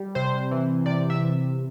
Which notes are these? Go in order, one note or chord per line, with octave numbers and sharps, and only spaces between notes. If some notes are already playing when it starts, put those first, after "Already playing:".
Already playing: G3
C3 C5
E3
C3 D5
E5